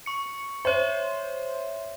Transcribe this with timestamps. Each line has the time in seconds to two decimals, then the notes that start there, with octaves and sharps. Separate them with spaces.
0.06 C#6 C#7
0.65 C5 C#5 E5